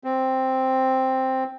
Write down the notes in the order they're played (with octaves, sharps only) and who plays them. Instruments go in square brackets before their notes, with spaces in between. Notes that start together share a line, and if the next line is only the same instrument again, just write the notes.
[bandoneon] C4